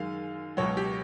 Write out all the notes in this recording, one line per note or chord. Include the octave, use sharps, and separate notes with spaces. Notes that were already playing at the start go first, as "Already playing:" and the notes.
Already playing: F#2 D#3 G#3 F5
C#2 B2 F#3 C#5
G4